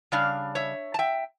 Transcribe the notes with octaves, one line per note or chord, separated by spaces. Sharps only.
C#3 G3 D4 D5 F5
C#5 E5
A5
E5 G5